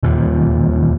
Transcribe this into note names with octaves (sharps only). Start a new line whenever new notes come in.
E1 D#2 A#2